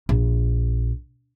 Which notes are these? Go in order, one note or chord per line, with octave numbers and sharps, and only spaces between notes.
A#1